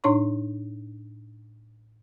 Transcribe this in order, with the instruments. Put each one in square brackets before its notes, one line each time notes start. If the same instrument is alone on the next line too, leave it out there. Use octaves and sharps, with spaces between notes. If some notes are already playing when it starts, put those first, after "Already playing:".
[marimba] A2 D4 D#4 C#5 C6 C#6